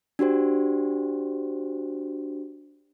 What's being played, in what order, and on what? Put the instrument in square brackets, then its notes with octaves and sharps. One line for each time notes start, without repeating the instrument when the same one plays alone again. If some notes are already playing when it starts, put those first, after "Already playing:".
[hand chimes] D4 F#4 G4 C5